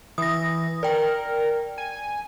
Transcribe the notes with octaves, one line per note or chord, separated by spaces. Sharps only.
E3 D#6 A#6
A#4 D5 G5
G#5